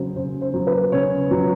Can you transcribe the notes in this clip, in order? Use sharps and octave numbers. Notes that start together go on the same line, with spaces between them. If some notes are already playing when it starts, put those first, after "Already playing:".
Already playing: C#3 F#3 C5
C#3 C5
C5
F#3
B4
C#3 C#5
F#3